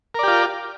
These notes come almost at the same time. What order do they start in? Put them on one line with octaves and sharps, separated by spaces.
A#4 D5 G4 F4